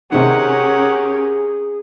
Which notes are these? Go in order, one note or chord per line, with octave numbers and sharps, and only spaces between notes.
C3 D#3 C#4 G4 G#4 A#4 F#5